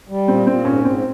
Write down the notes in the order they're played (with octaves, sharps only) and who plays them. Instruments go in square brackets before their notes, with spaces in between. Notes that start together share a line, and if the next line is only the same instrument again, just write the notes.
[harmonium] G3
[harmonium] A#2 [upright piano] C4
[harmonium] A#2 [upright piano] C4
[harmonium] G#2 [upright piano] C#4
[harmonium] G#2 [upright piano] C4